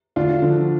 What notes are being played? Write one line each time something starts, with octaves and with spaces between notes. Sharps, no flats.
D2 D4 F4
D3 F3